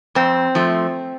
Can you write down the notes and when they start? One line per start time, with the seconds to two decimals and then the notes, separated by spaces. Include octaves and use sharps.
0.15 F2 C4
0.55 F3 A3